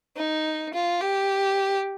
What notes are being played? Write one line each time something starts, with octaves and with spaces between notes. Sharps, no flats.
D#4
F4
G4